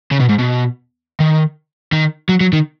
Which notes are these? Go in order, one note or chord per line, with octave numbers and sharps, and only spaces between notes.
C#3
B2
G#2
B2
D#3
D#3
F#3
F#3
D#3